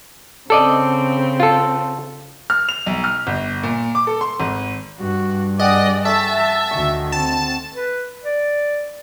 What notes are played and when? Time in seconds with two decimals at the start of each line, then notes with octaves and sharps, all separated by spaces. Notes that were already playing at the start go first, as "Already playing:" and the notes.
0.50 C#3 C4 A4 D5 D#5
1.40 F4 A4
2.50 F6
2.69 F7
2.86 B1
3.04 F6
3.27 G1
3.63 A#2
3.95 D6
4.07 A4
4.21 C6
4.40 G#1
4.98 G2 F#4
5.60 G#4 D5 D#5 F#5 G5
6.05 A3 E5 A5
6.71 D2 D#3 C#6
7.12 C4 A5
7.75 B4
8.24 D5